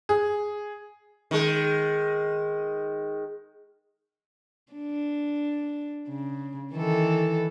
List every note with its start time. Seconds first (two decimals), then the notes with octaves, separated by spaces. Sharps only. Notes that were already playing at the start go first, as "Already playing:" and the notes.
0.09 G#4
1.31 D#3 G#3
4.73 D4
6.09 C#3
6.73 D#3 E3 A4